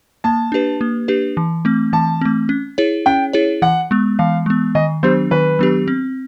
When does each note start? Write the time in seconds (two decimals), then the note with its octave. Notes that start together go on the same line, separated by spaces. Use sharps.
0.24 A#3 A5
0.52 D4 G4 B4
0.81 A#3
1.08 D4 G4 B4
1.37 E3
1.65 A3 C4
1.93 E3 A5
2.21 A3 C4
2.49 C#4
2.78 E4 G#4 C#5
3.06 C#4 G5
3.33 E4 G#4 C#5
3.62 E3 F#5
3.91 G#3 B3
4.19 E3 F5
4.46 G#3 B3
4.75 D#3 D#5
5.03 F#3 B3 D4 G4 C5
5.31 D#3 B4
5.59 F#3 B3 D4 G4
5.88 C4